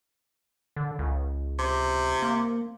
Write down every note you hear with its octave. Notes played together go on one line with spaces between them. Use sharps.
D3
C#2
C3
A#3